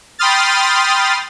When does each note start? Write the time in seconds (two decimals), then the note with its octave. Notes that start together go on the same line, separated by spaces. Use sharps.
0.19 G5 B5 C6 D#6 F6 A6